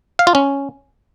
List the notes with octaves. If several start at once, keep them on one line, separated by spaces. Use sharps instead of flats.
F5
F4
C#4